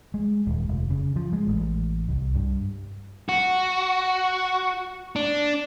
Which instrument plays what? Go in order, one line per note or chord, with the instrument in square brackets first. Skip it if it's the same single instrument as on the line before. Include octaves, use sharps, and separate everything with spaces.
[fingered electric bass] G#3
D#1
F1
C#3
F3
G#3
A1
C2
G2
[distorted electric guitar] F#4
D4